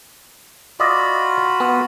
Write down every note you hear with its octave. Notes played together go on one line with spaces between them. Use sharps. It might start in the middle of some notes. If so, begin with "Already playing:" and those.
F4 F#4 D5 D#5 B5
B3